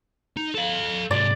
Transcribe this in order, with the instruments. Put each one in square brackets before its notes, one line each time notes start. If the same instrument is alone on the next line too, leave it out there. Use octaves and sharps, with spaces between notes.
[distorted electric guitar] D#4
A4 F5
[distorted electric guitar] G#2 C3 [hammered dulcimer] D5